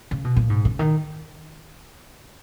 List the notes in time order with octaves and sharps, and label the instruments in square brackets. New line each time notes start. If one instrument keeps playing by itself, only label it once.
[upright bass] C#3
B2
A#2
G#2
C#3
D#3